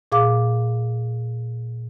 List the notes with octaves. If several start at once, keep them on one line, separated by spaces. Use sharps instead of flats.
A#2 G#4 F5 D6